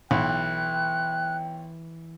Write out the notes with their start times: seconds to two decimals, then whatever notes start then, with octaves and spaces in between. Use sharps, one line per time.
0.11 B1 E3 G5 F#6